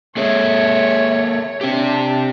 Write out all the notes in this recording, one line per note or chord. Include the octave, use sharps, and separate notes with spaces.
A#3 G#4 A4 C#5 E5
C4 D4 G4